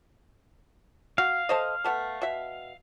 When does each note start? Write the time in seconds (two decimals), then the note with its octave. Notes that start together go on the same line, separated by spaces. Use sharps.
1.18 F#4 F5
1.49 A4 C5 D#5
1.84 A3 B3 A4
2.22 B2 E5